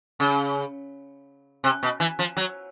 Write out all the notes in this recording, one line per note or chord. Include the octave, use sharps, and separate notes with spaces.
C#3
C3
B2
E3
F3
F#3